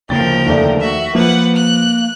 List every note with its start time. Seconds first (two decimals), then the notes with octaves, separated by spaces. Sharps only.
0.10 D2 C#3 F3 A#3 A#4 G5 A6
0.46 D#2 A3 D5
0.81 F#4 E5
1.15 F3 A#3 B4 F#5
1.55 F#6